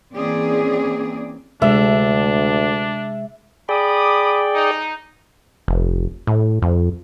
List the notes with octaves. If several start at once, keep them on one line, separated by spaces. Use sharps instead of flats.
E3 A#3 C4 C#4 G#4 D5
D2 C3 G#3 D4 E5
G#4 D5 G5 B5 D6 D#6
D#4
F1
A2
F2